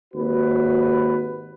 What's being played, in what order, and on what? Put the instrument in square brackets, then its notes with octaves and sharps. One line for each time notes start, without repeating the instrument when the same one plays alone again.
[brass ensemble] G#1 D#2 F#4 B4